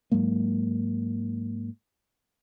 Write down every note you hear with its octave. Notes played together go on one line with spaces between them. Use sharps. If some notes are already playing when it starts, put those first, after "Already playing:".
G#2 F#3 G#3 A#3